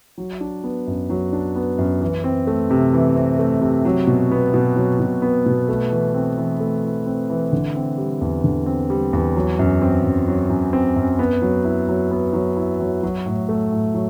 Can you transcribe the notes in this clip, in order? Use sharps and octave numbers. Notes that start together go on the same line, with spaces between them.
F#3
D4
B3
F#2
F#3
D4
B3
F#2
E3
C4
A3
C3
E3
C4
A3
C3
F#3
B2
B3
B2
F#3
B2
B3
B2
A3
E3
C4
E3
A3
E3
C4
E3
D3
C4
G3
E2
D3
C4
G3
E2
F#3
F#2
C4
F#2
F#3
F#2
C4
F#2
B3
F#3
E4
F#3
B3
F#3
E4
F#3
F#3
A2
A3
A2
F#3